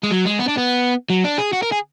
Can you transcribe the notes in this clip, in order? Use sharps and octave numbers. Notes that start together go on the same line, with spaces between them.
G#3
F#3
G#3
B3
D4
B3
F#3
D4
G#4
F#4
A#4
G#4